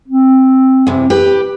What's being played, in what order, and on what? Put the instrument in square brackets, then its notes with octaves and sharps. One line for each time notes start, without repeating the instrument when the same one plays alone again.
[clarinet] C4
[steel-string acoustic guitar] E2 C3
G4 B4